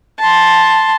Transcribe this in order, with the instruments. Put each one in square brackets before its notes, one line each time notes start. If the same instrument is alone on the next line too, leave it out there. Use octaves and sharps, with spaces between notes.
[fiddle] A5 C6